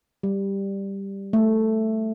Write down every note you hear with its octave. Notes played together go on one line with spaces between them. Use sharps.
G3
A3